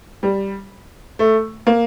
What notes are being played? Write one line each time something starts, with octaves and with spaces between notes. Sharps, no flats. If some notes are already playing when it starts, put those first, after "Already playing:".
G3
A3
A#3